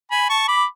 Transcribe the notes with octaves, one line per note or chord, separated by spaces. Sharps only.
G#5 B5
A5 C#6
B5 D6